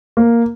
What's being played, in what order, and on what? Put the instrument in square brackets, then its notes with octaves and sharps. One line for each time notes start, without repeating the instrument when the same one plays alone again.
[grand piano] A#3